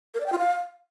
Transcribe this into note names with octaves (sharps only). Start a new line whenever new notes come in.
A#4
D5
G5
F4
F5